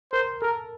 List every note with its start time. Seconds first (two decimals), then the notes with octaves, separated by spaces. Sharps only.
0.13 A#4 C5
0.42 A4 A#4